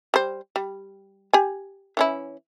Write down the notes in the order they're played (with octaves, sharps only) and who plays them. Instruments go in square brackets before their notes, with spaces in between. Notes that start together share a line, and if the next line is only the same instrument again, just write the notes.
[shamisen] G3 C5
G3
G4 G#5
E3 C#4 E4